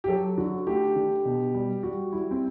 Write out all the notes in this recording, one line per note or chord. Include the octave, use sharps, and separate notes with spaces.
G4
F#3 A4
D3 F#4
A3 G4
D3
B2
G3
G3 F#4
G3 E4
C4